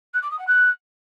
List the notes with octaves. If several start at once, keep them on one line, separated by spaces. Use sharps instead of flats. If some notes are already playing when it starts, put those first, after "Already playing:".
F#6
D6
D#6
F#5
F#6